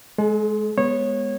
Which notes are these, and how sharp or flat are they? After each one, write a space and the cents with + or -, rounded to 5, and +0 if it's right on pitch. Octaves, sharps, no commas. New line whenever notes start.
G#3 +15 A4 -45
G#3 -5 B3 +0 C#5 -20